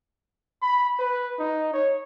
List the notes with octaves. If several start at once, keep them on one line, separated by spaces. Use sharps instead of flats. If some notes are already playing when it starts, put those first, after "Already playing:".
B5
B4
D#4
C#5